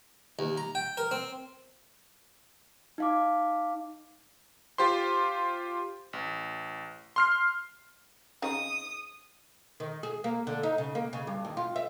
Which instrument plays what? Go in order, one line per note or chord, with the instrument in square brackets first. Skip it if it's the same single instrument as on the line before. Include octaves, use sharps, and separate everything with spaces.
[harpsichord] D#2
A#5
G5
A#4
C4
[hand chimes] D#4 F5 D6
[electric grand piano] F4 G4 C5 C6
A1
C6 F6 C7
[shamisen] C#3 C4 D#4 [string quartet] D#6
[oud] D#3
G#4
A#3
D3
D#4
C#3
A#3
C#3
G2
D#2
F4
E5